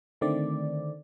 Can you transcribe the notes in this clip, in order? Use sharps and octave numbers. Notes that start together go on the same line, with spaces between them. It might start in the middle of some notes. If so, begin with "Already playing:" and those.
D3 D#3 A3 C4 D5